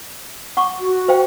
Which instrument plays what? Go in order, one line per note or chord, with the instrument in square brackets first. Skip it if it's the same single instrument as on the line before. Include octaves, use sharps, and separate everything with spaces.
[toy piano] F#5 C#6 D6
[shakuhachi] F#4
[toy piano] C5 F5 G5